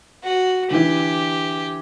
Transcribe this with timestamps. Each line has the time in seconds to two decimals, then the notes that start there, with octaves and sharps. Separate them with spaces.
0.24 F#4
0.71 D3 E3 G4